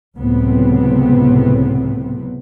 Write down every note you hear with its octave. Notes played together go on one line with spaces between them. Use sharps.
C#2 A2 C3 F#3 B3 C4